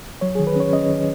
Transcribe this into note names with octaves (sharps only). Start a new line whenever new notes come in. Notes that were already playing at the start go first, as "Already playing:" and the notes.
F#3 C#5
D#3 G#4
B4
C#4 C#5
C#4 D#5
D#3